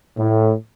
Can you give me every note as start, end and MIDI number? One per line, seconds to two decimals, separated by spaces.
0.18 0.52 45